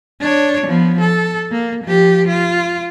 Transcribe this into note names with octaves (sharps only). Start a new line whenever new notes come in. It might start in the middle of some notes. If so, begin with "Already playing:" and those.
D4 C#5
F3 B3
A4
A#3
F3 G4
F4